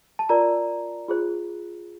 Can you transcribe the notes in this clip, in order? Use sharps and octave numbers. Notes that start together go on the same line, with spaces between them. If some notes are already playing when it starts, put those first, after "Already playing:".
A5
F4 A#4 D5 A#5
F4 G#4 C5